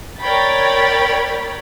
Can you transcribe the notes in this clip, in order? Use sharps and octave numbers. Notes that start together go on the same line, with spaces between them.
A#4 C#5 D5 G5 B5 A6